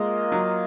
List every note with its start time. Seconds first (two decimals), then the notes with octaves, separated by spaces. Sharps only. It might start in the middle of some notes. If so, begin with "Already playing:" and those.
Already playing: G#3 A#3 F4 A#4 D#5
0.32 F#3